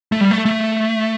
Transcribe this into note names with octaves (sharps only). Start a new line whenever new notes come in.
A3
G3
A3
A3